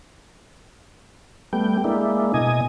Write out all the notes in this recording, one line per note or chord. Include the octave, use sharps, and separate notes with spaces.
G3 A3 B3 G5
G#3 A#3 D4 E4
B2 D#5 G#5